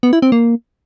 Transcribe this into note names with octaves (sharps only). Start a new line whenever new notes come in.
B3
E4
C4
A#3